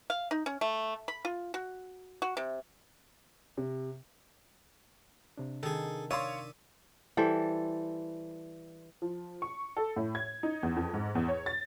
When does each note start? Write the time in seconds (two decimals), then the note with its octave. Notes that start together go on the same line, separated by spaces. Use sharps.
0.10 F5
0.31 D#4
0.46 C#4
0.61 A3
1.08 B5
1.25 F4
1.54 F#4
2.22 F#4
2.37 C3
3.57 C3
5.37 C3 D4
5.63 D#3 G#4 A4
6.11 C#5 D5 E5 F5 C6 D#6
7.17 E3 G3 A4 C5
9.02 F3
9.42 C#6
9.77 A4
9.96 A2
10.15 G#6
10.43 D#4
10.63 E2
10.76 F2
10.94 G#2
11.15 E2
11.28 C#5
11.46 A6